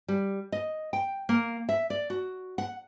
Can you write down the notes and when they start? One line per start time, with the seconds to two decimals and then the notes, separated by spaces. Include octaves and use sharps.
0.08 G3
0.52 D#5
0.93 G5
1.29 A#3
1.69 E5
1.90 D5
2.10 F#4
2.58 F#5